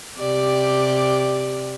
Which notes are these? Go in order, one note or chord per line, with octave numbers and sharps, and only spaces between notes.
C3 G4 D5